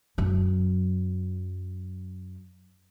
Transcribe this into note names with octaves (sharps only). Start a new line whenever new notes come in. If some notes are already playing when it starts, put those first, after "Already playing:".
F#2 F#3